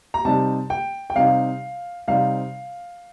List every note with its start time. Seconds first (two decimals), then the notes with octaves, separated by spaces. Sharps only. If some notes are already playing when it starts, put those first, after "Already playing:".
0.14 A#5
0.25 C3 G3 C4 D#4 A5
0.70 G5
1.10 G5
1.16 C3 G3 C4 D#4 F5
2.08 C3 G3 C4 D#4 F5